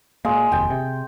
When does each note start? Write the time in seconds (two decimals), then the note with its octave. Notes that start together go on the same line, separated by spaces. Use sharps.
0.25 A#2 G#3 A#3
0.52 F1 D#2 G5
0.70 C3